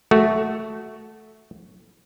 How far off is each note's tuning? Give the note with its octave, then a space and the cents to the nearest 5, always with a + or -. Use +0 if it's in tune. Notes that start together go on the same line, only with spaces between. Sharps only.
A3 -10 F#4 +0